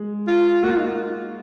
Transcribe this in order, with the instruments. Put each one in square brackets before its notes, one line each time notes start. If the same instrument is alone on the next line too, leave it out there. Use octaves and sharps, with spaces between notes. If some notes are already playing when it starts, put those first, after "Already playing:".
Already playing: [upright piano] G#3
[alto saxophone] F4
[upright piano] A#3 [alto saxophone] F#4
[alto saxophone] F4
D#4